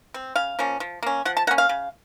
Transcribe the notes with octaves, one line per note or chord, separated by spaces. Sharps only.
C4
C#3 F5
F3 A#3 C#4
F3
A#3 C#4
F3 F#5
A5
A#3 C#4 F#5
F5
C#3